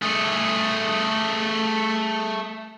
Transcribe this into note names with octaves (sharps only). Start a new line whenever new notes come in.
A3 G#4